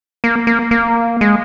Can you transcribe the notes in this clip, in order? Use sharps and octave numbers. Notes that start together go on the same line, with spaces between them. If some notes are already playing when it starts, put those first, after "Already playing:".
A#3
A#3
A#3
G#3